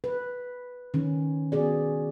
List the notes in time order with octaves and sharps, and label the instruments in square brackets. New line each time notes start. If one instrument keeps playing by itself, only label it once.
[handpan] B4
D#3 C#4
B3 F#4 G#4 D5